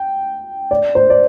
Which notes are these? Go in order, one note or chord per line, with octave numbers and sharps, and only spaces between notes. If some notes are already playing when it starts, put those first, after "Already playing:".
Already playing: G5
D5
C5
D5